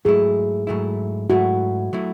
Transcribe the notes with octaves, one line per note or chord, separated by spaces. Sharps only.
G#2 F#3 A3 E4 G#4
G#2 F#3 A3 E4
G#2 F#3 A3 E4 F#4
F#3 A3 E4